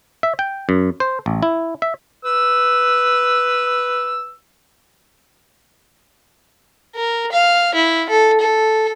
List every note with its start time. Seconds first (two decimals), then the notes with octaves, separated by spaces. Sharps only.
0.23 E5
0.39 G5
0.69 F#2
1.00 C5
1.26 A1
1.43 E4
1.82 E5
2.24 B4 E6
6.96 A#4
7.32 F5
7.75 E4
8.09 A4
8.41 A4